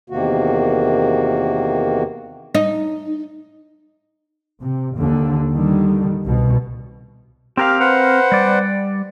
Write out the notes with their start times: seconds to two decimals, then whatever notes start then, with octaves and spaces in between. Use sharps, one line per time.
0.10 E2 C3 D#3 A#3 F#4
2.55 D#4
4.61 C3
4.96 D#2 D3
5.50 D3 D#3 G3
6.24 C2 B2
7.57 C4 G4 A#4 F5
7.80 B4 C5 F#5
8.32 G3 D5